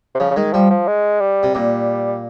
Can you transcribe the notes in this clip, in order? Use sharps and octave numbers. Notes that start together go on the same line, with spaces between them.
C3
C#3 F3
C#3
D#3 G#3
F3 G3
F3
G#3
G3
C3
A#2 G3